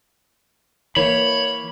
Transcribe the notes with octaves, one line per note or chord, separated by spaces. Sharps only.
E3 A#3 C#5 B5